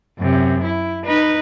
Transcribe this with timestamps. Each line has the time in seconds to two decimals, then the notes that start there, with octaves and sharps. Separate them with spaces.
0.19 F#2 C3
0.64 E4
1.05 D#4 B4